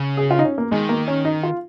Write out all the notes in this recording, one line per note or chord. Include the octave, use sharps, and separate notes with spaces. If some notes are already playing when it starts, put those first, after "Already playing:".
Already playing: C#3
G#4
F4
D#4
C#4
A#3
D#3 G#3
A#3
C#4
D#4
F4